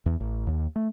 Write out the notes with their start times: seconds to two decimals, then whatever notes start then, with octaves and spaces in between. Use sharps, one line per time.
0.06 E2
0.20 A1
0.47 D#2
0.76 A3